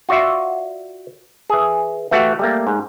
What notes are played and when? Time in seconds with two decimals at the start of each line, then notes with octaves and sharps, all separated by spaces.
0.09 F4 F#4 D5 E5
1.50 E3 G#4
2.11 E3 A3 F#4 G4 F5 F#5
2.39 G3 A3 A#3
2.67 G#2